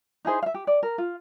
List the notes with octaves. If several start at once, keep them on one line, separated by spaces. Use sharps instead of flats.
D#4 E4 G#4 C5
E5 F5
G4
D5
A#4
F4